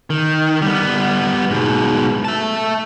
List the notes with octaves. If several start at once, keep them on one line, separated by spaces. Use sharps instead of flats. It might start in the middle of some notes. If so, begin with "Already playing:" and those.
D#3
G3 B3
G#2 B2
E5 A5